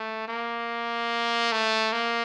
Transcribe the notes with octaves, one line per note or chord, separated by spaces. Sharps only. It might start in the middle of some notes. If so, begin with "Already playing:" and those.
Already playing: A3
A#3
A3
A#3